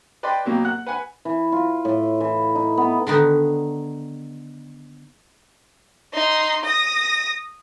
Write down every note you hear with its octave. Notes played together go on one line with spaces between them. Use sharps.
B4 D5 D#5 G5 B5 C6
B2 F#3 A#3 G4
F#5 F#6
B4 F#5 G#5 B5
E3
F4
A2
E3
D#4
B3
D3 D#3 B3 D#4
D#4 C6
D#6 A#6